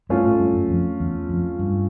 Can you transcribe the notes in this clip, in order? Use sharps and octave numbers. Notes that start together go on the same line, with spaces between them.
G2 A3 C#4 F4
A2
G2
F#2
F2
E2
F2
G2